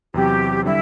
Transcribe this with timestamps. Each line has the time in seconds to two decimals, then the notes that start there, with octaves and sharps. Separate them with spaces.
0.14 E2 C3 F#3 C4 G4
0.65 D3 G3 E4